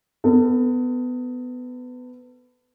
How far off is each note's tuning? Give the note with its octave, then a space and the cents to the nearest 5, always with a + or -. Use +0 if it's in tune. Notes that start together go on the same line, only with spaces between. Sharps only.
B3 +20 A4 +35